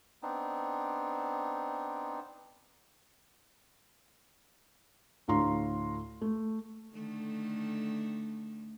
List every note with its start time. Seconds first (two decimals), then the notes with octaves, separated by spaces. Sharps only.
0.23 B3 C4 D4 D#4
5.28 D2 A2 F5 A#5 C6
6.21 A3
6.94 D3 D#3 A3